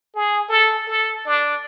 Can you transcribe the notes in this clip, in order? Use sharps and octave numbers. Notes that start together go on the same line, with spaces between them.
G#4
A4
A4
D4